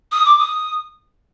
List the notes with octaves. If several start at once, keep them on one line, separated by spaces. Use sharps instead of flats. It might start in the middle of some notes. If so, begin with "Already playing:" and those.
D#6
D6
D#6